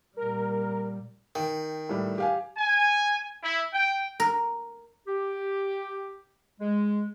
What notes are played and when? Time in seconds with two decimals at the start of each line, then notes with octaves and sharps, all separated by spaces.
0.17 A#2 G3 A#4
1.35 D#3 G5
1.89 A2 G3
2.18 G4 F5 G#5
2.57 G#5
3.43 E4
3.73 G5
4.20 A#4
5.07 G4
6.60 G#3